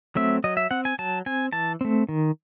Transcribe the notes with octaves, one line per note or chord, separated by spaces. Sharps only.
F#3 A3 C4 E5
F#3 D#5
E5
C4 F#5
G#5
F#3 A5
C4 G#5
E3 A5
A3 C4
D#3